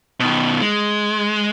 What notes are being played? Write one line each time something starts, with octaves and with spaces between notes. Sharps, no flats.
B2 D#3
G#3